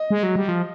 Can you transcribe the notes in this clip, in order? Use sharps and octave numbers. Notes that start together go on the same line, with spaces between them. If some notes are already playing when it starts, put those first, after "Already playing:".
Already playing: D#5
G#3
F#3
G3
F3